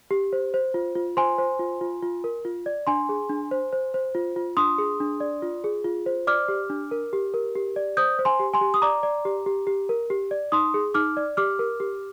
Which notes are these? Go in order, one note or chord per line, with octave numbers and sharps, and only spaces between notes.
G4
C5
C5
F4
F4
C5 G#5 C6
C5
F4
F4
F4
A#4
F4
D5
D4 G#5 C6
G#4
D4
C5
C5
C5
F4
F4
D4 C6 D#6
G#4
D4
D5
F4
G#4
F4
C5
D5 D6 F6
G4
D4
A#4
G4
A#4
G4
D5
C5 D#6 G6
C5
G#5 C6
G4
G#5 C6
G4
D#6
D5 A#5 D6
D5
G4
G4
G4
A#4
G4
D5
D#4 C6 D#6
G#4
D#4 D6 F6
D5
G4 D6 F6
A#4
G4